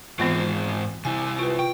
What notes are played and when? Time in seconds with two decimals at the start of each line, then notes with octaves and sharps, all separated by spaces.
0.19 G#2 E3 G#3 B3 C4 F4
1.05 C3 E4 G#5
1.39 F4 B4
1.59 F4 G5